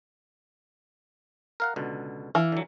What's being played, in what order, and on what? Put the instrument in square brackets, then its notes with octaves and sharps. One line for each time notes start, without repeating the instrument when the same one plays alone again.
[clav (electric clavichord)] A#4 F5 F#5
C#2 B2 D3
[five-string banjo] E3 [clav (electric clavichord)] F5
[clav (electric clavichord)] D3 F#3